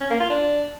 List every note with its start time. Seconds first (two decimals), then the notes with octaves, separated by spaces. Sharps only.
0.01 C#4
0.10 A#3
0.20 F4
0.30 D4